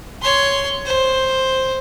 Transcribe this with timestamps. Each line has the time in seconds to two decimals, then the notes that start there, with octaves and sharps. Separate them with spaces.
0.22 C#5 C6
0.86 C5